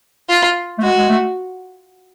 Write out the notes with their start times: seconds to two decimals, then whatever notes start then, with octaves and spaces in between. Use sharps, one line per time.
0.29 F4
0.78 A3
0.82 G#3 F#4
0.98 G#3
1.09 A3